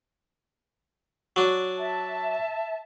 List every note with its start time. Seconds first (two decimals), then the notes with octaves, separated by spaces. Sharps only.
1.36 F#3 D4
1.78 E5 A5